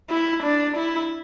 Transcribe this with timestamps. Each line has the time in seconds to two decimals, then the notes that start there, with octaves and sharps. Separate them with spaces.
0.10 E4
0.44 D4
0.77 E4